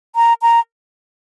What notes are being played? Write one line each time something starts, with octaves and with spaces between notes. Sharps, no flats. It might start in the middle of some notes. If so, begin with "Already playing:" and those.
A#5
A#5